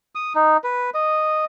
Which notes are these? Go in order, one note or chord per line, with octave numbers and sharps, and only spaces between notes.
D#6
D#4
B4
D#5